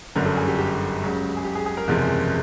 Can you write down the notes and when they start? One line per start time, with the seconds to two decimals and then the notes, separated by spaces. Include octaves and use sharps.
0.15 G1 F#2 D3 F#3 A#4
0.26 A4
0.37 G#4
0.48 G4
0.58 G4
1.02 C#2 C#3 F#3
1.37 G#4
1.45 G4
1.55 G#4
1.66 G#4
1.77 A#4
1.88 F#1 E2 C3 F3 G#3